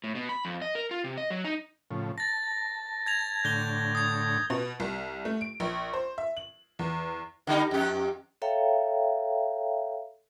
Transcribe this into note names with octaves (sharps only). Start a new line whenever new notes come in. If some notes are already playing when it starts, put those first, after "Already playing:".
A2
B2
B5
F2
D#5
A#4
F4
C3
D#5
F#3
D#4
A2 C#3 F3
A5 A6 A#6
G#6 A#6 F7
A2 D3 G6 A#6 G7
D#6 G#6
B2
C2
A3
D7
A#1
C5
E5
F#7
E2
D3 G3 D#4
F2 G4
A4 C#5 E5 F5 G5 A#5